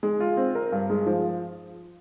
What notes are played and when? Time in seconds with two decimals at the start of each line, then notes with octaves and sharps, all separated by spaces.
0.03 G#3
0.20 F4
0.37 C4
0.55 A#4
0.72 G2
0.90 G#3
1.06 F3